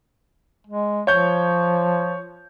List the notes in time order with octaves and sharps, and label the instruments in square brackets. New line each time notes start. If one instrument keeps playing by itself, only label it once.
[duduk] G#3
[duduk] F3 [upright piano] C#5 G6